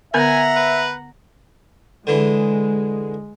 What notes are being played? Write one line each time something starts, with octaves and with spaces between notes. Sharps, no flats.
D3 B3 A#4 E5 F#5 G#5 A#5
B4
D3 E3 G#3